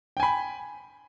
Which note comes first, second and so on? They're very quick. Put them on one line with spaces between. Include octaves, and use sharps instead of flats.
G5 G#5 B5